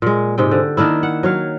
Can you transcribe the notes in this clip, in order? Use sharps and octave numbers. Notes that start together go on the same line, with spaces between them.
A#2 G#3
G#2 C3 G#3 G5
D3
D#3 A#3 D4 E4
F#5
F#3 C#5 F5